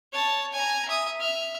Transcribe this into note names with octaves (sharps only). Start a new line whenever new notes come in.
C#5 A5
G#5 A#5
E5 D#6
E5 F6